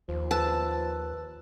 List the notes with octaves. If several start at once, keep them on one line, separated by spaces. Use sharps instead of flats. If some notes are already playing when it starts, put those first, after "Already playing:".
D#2 F3
B4 A5 E6 F#6